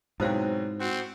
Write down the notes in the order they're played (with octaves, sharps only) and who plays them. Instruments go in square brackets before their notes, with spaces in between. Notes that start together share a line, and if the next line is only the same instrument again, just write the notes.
[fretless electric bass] G#2 [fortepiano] B2 F#3 C4 [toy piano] E4 C5 F5
[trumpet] C4 [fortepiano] F#4